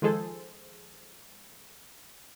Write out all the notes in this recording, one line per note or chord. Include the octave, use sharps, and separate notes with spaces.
D#3 F3 G#3 G#4 A4 C5